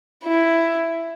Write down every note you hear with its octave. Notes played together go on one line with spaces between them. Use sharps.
E4